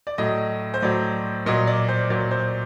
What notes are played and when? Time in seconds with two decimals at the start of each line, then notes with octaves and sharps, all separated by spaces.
0.07 D5
0.18 A2 F#3 D#5
0.74 C5
0.82 A2 F#3 D5
1.46 A#2 F#3 D#5
1.67 D5
1.88 C5
2.10 A#2 F#3 D5
2.31 C5